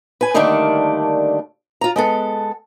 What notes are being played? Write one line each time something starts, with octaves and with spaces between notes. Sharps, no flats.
B4 G#5
D3 D#3 G3 A3 A#3 D4
F4 A#5
G#3 B3 A4